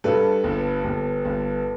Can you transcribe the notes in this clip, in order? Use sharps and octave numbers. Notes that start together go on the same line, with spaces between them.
G2 A4 B4
G1
G1
G1